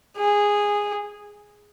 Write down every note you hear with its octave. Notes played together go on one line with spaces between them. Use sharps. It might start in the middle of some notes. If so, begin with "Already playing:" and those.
G#4